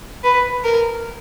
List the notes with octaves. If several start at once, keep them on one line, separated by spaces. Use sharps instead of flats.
B4
A#4